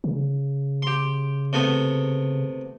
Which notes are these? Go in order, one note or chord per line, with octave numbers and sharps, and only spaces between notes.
C#3
G4 C6
C3 A3 B3